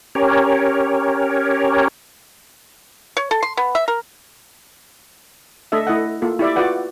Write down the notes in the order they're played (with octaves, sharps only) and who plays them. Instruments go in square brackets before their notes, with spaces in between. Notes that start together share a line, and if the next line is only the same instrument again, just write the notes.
[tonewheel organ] C#4 G4 A#4 C#5
[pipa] C#5
A4
C6
B3
E5
A#4
[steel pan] A3 D4 A4 D#5 E5
A3 E4 D#5 F#5
A#3 F4 A4
E4 G4 D5 E5
F4 F#4 B4 D5 F#5 G5